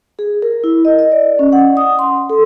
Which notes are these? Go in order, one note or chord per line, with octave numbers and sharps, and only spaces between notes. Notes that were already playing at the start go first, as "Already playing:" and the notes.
G#4
A#4
E4
D#5
D#5
D5
C#4
F#5
D#6
C6
A4